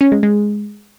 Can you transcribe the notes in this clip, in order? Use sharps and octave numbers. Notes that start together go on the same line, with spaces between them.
C#4
G#3
G#3